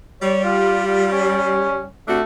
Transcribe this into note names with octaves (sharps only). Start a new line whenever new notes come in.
G3 C#5
F4
F4
C#4
C3 A3 D4 F#4